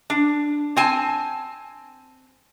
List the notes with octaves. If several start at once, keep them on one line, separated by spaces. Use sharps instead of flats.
D4
C4 G#5 A5